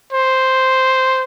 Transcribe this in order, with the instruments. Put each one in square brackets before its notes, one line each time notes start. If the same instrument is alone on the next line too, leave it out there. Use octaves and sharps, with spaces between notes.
[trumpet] C5